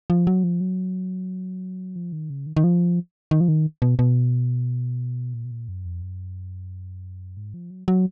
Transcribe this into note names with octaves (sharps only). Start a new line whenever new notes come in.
F3
F#3
F3
F#3
F3
D#3
C#3
D#3
D#3
F3
D#3
F3
D#3
B2
B2
A#2
B2
A#2
F#2
F2
F#2
G#2
F3
F#3
F#3